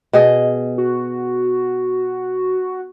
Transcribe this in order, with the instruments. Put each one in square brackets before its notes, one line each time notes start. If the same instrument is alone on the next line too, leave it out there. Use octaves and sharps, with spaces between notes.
[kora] B2 G#4 D#5
[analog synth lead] F#4